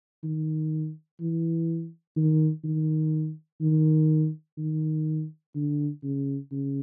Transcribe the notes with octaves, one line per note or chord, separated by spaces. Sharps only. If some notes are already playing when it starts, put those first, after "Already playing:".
D#3
E3
D#3
D#3
D#3
D#3
D3
C#3
C#3